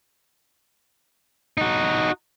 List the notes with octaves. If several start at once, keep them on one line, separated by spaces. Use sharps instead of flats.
D#4 F#4